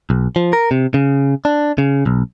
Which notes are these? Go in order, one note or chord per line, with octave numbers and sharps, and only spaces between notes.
B1
F3
A#4
C3
C#3
D4
C#3
B1